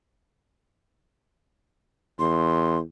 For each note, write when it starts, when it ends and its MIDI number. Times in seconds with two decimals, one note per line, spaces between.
2.19 2.81 40
2.19 2.79 84